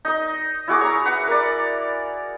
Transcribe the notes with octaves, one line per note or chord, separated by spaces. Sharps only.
D#4 D#5
E4 F#4 G#4 D6
C#5 A#5
B4 F#5
A#4 D5